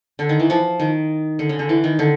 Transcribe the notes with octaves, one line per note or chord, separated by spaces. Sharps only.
D3
D#3
E3
F3
D#3
D3
C#3
D3
E3
D#3
D3